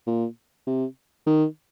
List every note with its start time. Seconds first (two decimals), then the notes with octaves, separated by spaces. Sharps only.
0.07 A#2
0.67 C3
1.27 D#3